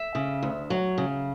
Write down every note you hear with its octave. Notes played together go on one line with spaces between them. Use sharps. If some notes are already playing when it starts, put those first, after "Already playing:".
Already playing: E5
C#3
D2
F#3
C#3